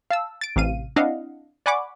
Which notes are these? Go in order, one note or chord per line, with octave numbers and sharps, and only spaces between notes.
F5 A5 E6
A6 D7
A1 C3 F5 D#7
C4 D4 E4 D#5 F5 F#5
D5 F#5 G#5 B5 C#6 D6